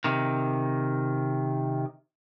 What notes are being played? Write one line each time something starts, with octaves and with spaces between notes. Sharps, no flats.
C3 D#3